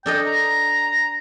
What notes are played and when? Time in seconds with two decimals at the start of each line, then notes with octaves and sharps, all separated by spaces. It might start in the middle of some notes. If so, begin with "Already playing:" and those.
0.06 D4 A4 D#5 G5
0.27 A#5